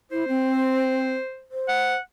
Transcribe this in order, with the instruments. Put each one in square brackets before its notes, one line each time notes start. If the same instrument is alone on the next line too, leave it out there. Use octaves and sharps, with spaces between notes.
[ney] E4 [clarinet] C5
[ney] C4
C5
[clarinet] F#5